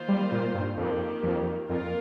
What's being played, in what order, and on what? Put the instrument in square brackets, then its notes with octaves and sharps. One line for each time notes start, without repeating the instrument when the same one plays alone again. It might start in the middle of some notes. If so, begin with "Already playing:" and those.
Already playing: [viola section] D#3 A#3 F4 C5
[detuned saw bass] G3
A#2
G2
[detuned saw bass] F2 [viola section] D#3 A#3 G4
[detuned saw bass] F2
[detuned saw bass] F2 [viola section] A#3 F4 A#4